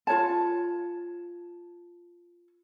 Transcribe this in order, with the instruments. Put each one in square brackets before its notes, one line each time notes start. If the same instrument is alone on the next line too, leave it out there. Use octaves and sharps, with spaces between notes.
[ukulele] F4 B4 C#5 A5